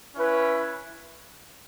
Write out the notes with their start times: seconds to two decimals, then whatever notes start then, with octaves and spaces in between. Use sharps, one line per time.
0.15 C#4 E4 B4